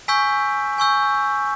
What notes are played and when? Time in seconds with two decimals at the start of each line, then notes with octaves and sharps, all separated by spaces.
0.08 G#5 C#6 E6 G6 B6
0.78 G#5 C#6 E6 G6